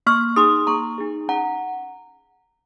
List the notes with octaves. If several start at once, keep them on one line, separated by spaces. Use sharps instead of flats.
A#3 C#6 F6
D#4 G#4 C6 D#6
A#3 A#5 C#6
D#4 G#4
C#4 F#5 A#5